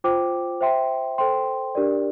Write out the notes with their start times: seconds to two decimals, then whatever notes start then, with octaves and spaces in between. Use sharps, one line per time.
0.04 F4 C5 G5 D6
0.61 C5 E5 G5 C6
1.18 A4 C5 G5 C6
1.75 D4 G4 A#4 D5